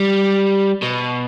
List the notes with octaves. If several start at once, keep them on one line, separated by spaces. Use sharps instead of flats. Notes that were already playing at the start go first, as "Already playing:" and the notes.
Already playing: G3
B2